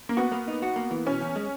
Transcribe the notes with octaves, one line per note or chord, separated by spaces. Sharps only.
A#3
B3 F#4
A#3
D#4
F#4
A#3
E3
B2 C#4
E2
G#3